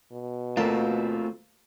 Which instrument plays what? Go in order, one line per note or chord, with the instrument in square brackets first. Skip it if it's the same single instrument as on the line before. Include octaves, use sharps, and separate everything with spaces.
[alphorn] B2
[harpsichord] D2 A#3 A5 [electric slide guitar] A3 C4 F4